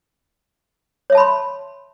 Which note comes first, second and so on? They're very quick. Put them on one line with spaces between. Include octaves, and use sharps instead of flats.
C#5 E5 A5 B5 C6